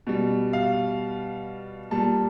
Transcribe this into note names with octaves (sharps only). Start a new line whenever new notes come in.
B2 G3
F5
A#2 G3 A5